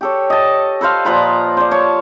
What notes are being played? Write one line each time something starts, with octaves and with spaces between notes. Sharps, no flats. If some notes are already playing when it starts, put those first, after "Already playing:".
G4 A4 C#5
D#5 A5
A4 B4 C5 F5
A#2 F3 B4 A#5
C5 D5
C#5 A5